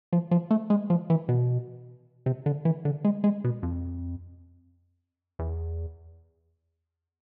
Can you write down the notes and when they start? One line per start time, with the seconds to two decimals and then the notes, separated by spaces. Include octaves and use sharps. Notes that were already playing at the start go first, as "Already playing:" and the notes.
0.13 F3
0.31 F3
0.51 A3
0.70 G#3
0.90 F3
1.10 E3
1.29 B2
2.26 C3
2.46 D3
2.65 E3
2.85 D3
3.04 G#3
3.24 G#3
3.44 B2
3.63 F2
5.39 E2